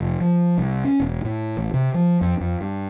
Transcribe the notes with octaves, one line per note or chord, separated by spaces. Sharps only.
F1
F3
C2
C#4
E1
A2
A1
C3
F3
F2
F2
G2